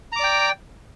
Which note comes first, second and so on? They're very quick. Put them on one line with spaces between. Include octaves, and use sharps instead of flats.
A#5 D6 D5 G5